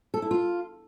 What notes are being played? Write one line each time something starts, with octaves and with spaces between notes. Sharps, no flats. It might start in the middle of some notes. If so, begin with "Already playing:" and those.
A4
E4
F4